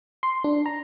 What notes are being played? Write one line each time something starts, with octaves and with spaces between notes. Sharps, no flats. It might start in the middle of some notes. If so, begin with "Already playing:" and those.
C6
D4
A#5